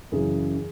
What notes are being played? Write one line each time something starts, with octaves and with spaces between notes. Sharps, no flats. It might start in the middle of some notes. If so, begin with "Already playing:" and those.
F#2 C#3 E3 G#4